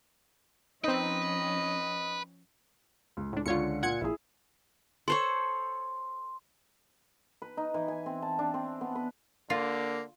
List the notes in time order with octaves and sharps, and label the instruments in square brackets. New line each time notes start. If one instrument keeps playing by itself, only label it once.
[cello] F3 C#4 [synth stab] C4 D#4 [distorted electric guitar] B4 [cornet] D#5
[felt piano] C#2
[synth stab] A2 D4
[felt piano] C#2 D3 [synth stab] F4 C#5 C#7
[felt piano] A#2 F4 [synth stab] F#5 G#6 C#7
[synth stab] A#1 A#2 [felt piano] E4 G#4
[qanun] A4 C5 C#5 [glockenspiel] C6
[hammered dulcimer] B4
D#4
E3
G#5
C4
A5
D4
C4
B3
B4
[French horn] D3 [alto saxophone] A#3 [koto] F4